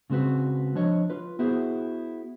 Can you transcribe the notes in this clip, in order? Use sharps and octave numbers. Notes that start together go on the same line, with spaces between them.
C#3 G#3 C4 F#4 B4
F3 D4 C#5 D#5
F4 B4
B3 E4 F#4 G#4 C5